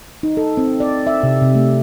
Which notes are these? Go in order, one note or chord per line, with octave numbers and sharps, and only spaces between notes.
D#4
A4
C4
D5
E5
C3
C3
A3